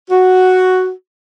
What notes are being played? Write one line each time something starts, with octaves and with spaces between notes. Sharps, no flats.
F#4